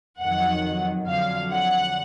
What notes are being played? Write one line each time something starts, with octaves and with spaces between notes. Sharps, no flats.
F2 D#3 F#3 F#5
F2 D3 F#3 F5
F#5